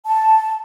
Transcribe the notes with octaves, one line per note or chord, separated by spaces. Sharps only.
A5